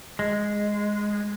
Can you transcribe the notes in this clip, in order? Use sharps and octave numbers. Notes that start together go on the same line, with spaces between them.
G#3